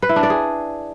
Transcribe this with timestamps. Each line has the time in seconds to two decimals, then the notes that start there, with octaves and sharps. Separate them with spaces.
0.02 B4
0.09 E4
0.16 D4
0.23 D5
0.30 G#4